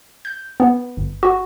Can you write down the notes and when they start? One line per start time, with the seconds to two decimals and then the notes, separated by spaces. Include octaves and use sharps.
0.25 G6
0.60 B3
0.97 G1
1.23 F#4